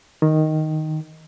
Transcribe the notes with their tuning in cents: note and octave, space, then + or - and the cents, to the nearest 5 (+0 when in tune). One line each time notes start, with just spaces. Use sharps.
D#3 +0